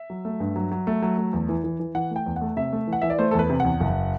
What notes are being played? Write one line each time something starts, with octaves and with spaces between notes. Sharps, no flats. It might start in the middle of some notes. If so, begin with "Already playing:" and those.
Already playing: E5
F#3
A3
G2
F#3
F#3
A3
F#3
A3
E2
E3
E3
E3
E3 F#5
A3
G5
E2
F#5
A3
C3 E5
A3
E3
F#5
E3 E5
D5
A3 C5
A4
E2 B4
C3
F#5
E2
F#1